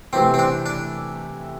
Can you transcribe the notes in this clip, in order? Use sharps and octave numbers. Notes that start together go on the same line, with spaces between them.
C3 E3 A3 C4 E4 G4
C4
D4
D4